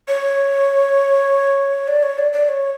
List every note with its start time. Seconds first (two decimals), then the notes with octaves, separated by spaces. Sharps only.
0.08 C#5
1.88 D5
2.03 C#5
2.18 D5
2.33 D5
2.48 C#5